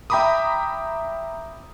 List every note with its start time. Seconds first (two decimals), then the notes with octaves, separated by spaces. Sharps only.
0.10 E5 G5 A#5 B5 D6 D#6